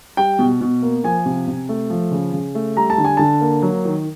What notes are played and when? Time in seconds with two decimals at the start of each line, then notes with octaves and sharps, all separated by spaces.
0.17 G3 G5
0.39 B2
0.61 B2
0.82 A#3
1.04 F3 G#5
1.26 C3
1.48 C3
1.69 A3
1.90 F3
2.11 C#3
2.33 C#3
2.55 A3
2.77 G3 A#5
2.90 A5
2.98 D3
3.04 G#5
3.17 D3 A5
3.41 A#3
3.62 F#3
3.85 D#3